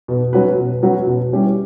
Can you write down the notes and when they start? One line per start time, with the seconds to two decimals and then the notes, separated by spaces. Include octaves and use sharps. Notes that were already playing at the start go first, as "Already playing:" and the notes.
0.08 B2
0.33 F#3 C#4 F#4 B4
0.58 B2
0.83 F#3 C#4 F#4 B4
1.07 B2
1.33 G3 C#4 E4 G4